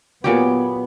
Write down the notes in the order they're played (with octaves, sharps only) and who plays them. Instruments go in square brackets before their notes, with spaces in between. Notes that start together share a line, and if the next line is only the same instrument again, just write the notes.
[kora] A#2 F#3 G4 [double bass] B3